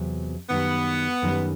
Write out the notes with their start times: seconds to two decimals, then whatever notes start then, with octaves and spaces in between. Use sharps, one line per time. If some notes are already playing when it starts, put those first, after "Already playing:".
Already playing: E2 C3 F#3
0.49 F#2 D#3 G3 B3
1.22 F#2 D#3 G3